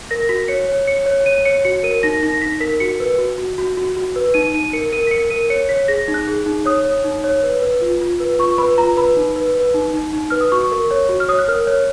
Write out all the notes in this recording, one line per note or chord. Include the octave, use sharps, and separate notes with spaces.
A#4 A#6
F#4 B6
C#5 C#7
C#5
C#5 C#7
C#5
C#5 D#7
C#5 C#7
F#4 C#7
A#4 D#7
D#4 A#6
D#4 A#6
D#4 B6
A#4 B6
F#4 C#7
B4
F#4
F#4
F#4
F#4
F#4
B4
D#4 D#7
D#4 D#7
A#4 C#7
A#4 D#7
B6
A#4 C#7
A#4 D#7
C#5 C#7
C#5 B6
G#4 A#6
D#4
F#6
G#4
D#4
C#5 D#6
C#5
D#4
C#5
B4
B4
F4
F4
B4
F4 C#6
B4 B5
F4 A#5
B4 B5
D#4
B4
B4
D#4
D#4
D#4
B4 F6
D#6
F#4 C#6
A#4
C#5
F#4
F6
C#5 D#6
F#6
A#4 F6
C#5